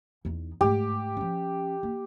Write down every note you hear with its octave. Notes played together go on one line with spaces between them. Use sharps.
E2 D#4
G#2 A3 G4
F3 C#4
A#3